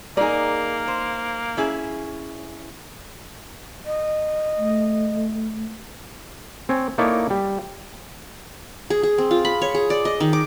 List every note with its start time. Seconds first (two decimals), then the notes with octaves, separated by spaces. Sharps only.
0.17 A#3 D#4 G#4 A#4 D5
0.88 C5
1.57 C#4 E4 G#4
3.85 D#5
4.58 A3
6.69 C4 C#5 G#5
6.98 A#3 D#4 E4 A4 C#5 D5
7.30 G3
8.90 G#4
9.03 G#4
9.18 C4
9.31 F4
9.45 B5
9.62 C#5
9.75 G#4
9.90 D5
10.05 D#5
10.20 D#3
10.33 D6